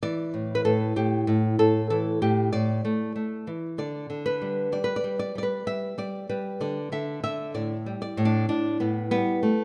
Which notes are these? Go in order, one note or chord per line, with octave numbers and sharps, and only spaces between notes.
E3 D5
A2
B4
A2 A4
A2 G4
A2
A2 A4
E3 A4
A2 G4
A2 D5
A3
A3
E3
D3 D5
D3
B4
G3
G3 D5
B4
D5
G3
D5
G3 D5
B4
G3 E5
G3 D5
G3 B4
D3 D5
D3 E5
D3 E5
A2 D5
G3
D5
A2
D4
A2 D4
A2 B3
G3 B3
A3